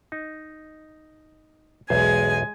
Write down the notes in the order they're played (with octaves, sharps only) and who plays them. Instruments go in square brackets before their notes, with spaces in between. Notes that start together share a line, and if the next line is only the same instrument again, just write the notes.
[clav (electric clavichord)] D#4
[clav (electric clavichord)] B1 E2 C5 [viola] G#3 G#5